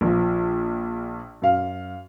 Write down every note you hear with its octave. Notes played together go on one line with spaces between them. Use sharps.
A#1 F3
F#2 F5